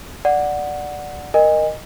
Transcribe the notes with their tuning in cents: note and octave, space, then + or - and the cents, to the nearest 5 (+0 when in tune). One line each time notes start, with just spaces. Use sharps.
D5 +0 F#5 -5
A#4 +0 D#5 -15 G#5 -30